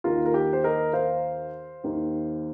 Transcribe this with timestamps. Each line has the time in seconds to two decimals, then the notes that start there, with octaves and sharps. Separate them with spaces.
0.04 D#2 D#3 F4 A#4
0.25 A#4
0.34 G4
0.53 C5
0.64 A#4 D#5
0.93 C5 F5
1.84 D#2 D#3